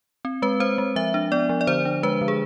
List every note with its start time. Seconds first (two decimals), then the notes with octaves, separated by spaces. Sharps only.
0.25 C4
0.42 G#3 B4
0.60 C4 C5
0.78 G#3
0.96 F3 E5
1.14 D4
1.32 B3 D5
1.49 F3
1.61 D5
1.67 D3 C5
1.85 D4
2.03 G#3 B4
2.21 D3
2.28 G#4